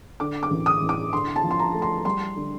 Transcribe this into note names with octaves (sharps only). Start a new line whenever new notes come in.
D3 D6
D6
A1
D#6
A1
D6
D3 C6
A5
F3
C6
A#5
A3
C6
G3 C6
D3